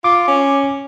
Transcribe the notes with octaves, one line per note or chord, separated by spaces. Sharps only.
F4 D6
C#4